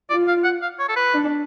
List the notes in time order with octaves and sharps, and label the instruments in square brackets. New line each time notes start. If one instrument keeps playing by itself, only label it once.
[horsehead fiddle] F4 [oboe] D5
[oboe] F5
F#5
F5
C#5
A4
B4
[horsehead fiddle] D4